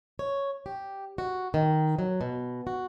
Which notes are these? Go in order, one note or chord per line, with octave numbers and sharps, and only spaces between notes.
C#5
G4
F#4
D#3
F#3
B2
F#4